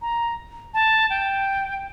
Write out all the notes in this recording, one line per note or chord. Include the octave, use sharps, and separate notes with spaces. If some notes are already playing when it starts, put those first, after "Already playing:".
A#5
A5
G5